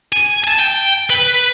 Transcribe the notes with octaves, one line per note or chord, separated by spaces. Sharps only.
G#5
G#5 A5
G5
B4